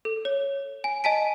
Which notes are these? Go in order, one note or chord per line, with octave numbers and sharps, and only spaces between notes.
A4
C#5
G#5
D#5 G#5 A5 B6 D7